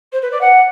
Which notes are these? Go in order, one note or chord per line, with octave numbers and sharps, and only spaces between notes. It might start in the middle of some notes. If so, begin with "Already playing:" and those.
C5
B4
D5
F#5